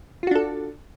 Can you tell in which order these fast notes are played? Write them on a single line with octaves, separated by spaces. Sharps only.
F4 F#4 D4 A4